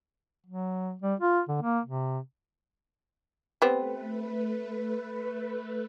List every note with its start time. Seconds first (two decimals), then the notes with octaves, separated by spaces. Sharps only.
0.47 F#3
1.02 G3
1.20 F4
1.49 D3
1.62 A#3
1.86 C3
3.62 G3 A3 B3 C4 B4